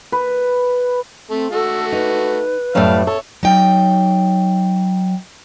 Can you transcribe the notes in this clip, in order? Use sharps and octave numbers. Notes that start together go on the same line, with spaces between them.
B4
A3 C4
A3 F#4 A4
D#4 B4
F#2 A2 G3 A3 F5 A5
A4 C#5
F#3 D#4 G5